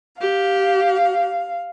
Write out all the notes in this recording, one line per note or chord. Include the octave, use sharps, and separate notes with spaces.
G4 F5